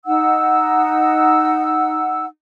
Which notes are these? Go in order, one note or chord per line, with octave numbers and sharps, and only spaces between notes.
D#4 F#5 E6